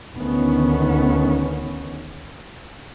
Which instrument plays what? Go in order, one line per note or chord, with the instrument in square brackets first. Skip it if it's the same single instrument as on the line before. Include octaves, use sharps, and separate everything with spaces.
[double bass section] D2 D#3 B3 C#4